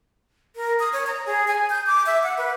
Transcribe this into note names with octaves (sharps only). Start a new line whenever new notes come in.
A#4
D#6
C#5
A#5
G#4
G#5
G6
D6
E5
F#5
B4